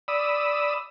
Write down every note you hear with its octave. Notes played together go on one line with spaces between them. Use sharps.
D5 B5 D#6 E6